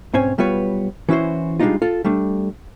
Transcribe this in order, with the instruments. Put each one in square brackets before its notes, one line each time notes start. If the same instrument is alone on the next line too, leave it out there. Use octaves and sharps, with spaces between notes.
[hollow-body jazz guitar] B1 G#2 C4 C#4 C#5 G#5
B1 G3 B3 F4 B4 C#5
E3 C#4 E4 F#4 C5
G3 G#3 B3 D4 D#4 F4
F4 A4
G3 A3 D4